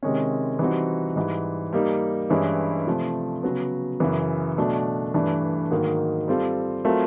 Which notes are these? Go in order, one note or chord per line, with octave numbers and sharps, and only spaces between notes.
C3 D#3 G#3 C#4
E3 G3 C4 D#4 F#4
G#2 E3 G3
G3 A#3 D#4
G2 E3 G#3 C#4 E4
C3 F3 A3
C#3 F#3 B3
F#2 C#3 E3
B2 F#3 A3 D4
G2 E3 A3 D4
G#2 D#3 F#3 A#3
G3 C4 F4 A4
F#3 A3 C4 F4 A#4